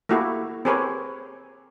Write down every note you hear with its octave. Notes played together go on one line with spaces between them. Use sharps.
A3 A#3 E4 F#4 G4
C4 G4 G#4 A#4 B4 C#5